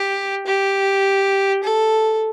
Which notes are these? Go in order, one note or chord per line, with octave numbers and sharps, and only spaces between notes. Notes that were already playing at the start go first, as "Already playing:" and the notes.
Already playing: G4
G4
A4